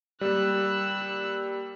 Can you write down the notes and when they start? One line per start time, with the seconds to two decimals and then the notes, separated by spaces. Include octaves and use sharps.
0.21 G3 A#3 E6 F#6